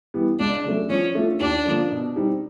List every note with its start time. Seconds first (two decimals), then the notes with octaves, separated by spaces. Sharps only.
0.14 E3 G3 B3
0.39 C#2 D4
0.64 C#3 F#3 A3
0.90 F3 C#4
1.15 A3 D4 F4
1.40 D#2 D4
1.65 D3 F3 A#3
1.91 B2
2.16 G3 C4 D#4